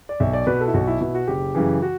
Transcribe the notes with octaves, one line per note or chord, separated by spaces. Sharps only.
D5
B1 E5
D5
B2 B4
A4
E4
B1 F#4
E4
B2 E4
F#4
F#1 G4
F#2 C#3 E3
F#4